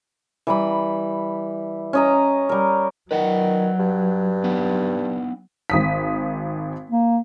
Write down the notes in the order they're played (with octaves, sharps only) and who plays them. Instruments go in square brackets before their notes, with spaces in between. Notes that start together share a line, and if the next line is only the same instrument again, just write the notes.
[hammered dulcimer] E3 G3 B5
C#4 D#5 A#5
G3 A#4
[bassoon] D#3 [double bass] F#3 [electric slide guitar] B4 D5 F#5
[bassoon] G2
[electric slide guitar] B3 D4 D#4
[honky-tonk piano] G#1 D#6 B6
[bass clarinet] A#3